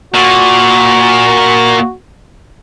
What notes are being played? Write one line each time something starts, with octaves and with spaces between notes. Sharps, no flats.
A#2 F#4